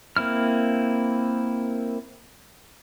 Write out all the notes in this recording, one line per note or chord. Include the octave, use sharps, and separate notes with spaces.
A#3 C4 E4 F6